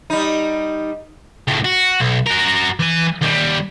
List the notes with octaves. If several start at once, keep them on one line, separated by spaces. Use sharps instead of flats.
G3 D#4
C#2 A2
F#4
B1
F#4 A#4
E3 G#5
D#2 G3